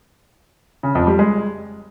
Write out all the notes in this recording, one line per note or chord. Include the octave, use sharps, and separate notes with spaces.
C#3
F2
G3
G#3